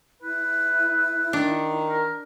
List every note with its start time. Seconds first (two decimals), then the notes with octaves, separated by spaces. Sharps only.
0.22 E4 B4
1.33 D#3 D4
1.90 A#4